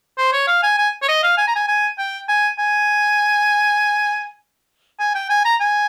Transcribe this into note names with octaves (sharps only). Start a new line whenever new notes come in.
C5
C#5
F5
G#5
G#5
C#5
D#5
F5
G#5
A#5
G#5
G#5
G5
G#5
G#5
G#5
G5
G#5
A#5
G#5